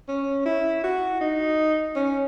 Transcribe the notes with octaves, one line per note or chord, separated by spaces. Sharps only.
C#4
E4
F#4
D#4
C#4